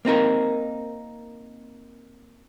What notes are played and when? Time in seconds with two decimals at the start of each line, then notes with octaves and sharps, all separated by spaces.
0.05 A#3 C4 D#4 A#4